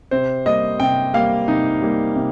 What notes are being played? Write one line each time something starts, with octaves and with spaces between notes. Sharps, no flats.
C3 C5
G3 A#3 D#5
C3 G5
G3 A#3 F5
C3 D#4
G3 A#3
C3